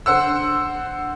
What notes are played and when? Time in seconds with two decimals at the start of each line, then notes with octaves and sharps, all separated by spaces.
0.06 D3 C5 F#5 E6